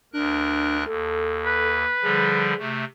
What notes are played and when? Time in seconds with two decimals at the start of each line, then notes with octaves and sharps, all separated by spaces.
0.13 D2 D4 A#4 F#6
0.86 D#2 A4
1.46 B4
2.02 D3 F3 G3 G#4
2.59 C3 A3